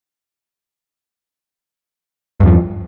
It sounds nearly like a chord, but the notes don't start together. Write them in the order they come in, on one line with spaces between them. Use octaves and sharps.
G2 E2 F3